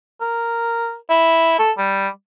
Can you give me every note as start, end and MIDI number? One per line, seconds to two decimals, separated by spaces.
0.21 0.95 70
1.10 1.57 64
1.59 1.72 69
1.78 2.09 55